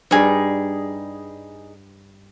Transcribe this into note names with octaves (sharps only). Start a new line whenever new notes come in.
G2 G3 D#4 G#4